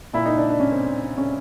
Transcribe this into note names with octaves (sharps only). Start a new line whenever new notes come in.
A#2 E4
D#4
D4
D4
C#4
C4
C#4